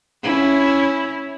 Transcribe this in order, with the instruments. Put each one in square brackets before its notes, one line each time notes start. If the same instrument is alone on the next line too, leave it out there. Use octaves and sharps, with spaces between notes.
[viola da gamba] C#4 E4